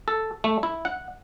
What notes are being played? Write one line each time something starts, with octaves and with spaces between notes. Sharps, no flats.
A4
A3
E4
F#5